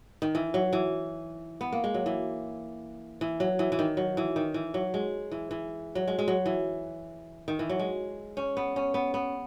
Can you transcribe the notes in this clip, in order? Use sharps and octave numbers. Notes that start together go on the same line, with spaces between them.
D#3
E3
F#3
E3
B3
A#3
G#3
F#3
E3
E3
F#3
E3
E3
D#3
F#3
E3
D#3
E3
F#3
G#3
E3
E3
F#3
G#3
G#3
F#3
E3
D#3
E3
F#3
G#3
C#4
B3
C#4
B3
B3